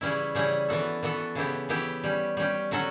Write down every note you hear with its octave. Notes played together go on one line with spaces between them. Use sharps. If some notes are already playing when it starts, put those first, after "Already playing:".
C#3 E3 G3 C#4 E4
C#3 E3 G3 C#4 E4
E3 B3 F#4 A4
E3 B3 F#4 A4
C#3 E3 B3 E4 G4
C#3 E3 B3 E4 G4
G3 C#4 G4
G3 C#4 G4
D3 F#3 C#4 F#4 A4